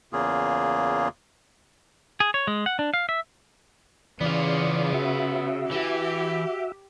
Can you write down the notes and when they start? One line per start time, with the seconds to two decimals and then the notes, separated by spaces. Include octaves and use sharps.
0.13 E2 C#3 A#3 F4 G#4
2.20 G#4
2.34 C#5
2.47 G#3
2.66 F#5
2.79 D4
2.94 F5
3.09 E5
4.21 C#3 E3 B3 F4 D5
4.94 F#4 E5
5.71 E3 G4